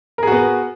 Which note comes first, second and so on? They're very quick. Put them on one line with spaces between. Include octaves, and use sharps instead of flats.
A#4 G#4 F#4 B3